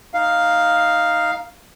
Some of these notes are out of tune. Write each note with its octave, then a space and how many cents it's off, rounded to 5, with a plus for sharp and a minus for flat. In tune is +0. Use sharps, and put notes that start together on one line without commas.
D#4 +0 F5 +0